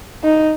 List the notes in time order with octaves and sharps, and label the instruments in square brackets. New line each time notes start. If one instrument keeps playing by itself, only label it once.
[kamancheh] D#4